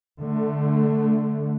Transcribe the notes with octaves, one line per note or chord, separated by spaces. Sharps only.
D3 A3